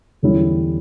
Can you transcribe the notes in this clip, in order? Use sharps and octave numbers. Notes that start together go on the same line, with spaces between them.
E2 D3 G3 C#4 E4